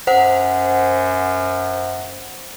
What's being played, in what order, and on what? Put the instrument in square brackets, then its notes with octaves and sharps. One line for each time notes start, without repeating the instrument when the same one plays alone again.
[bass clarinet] F#2 [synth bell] C5 F#5